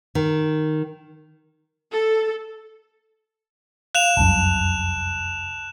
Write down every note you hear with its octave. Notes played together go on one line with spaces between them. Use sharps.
D#3
A4
F5 F#6 E7 F7
F1 C2 F#2 A5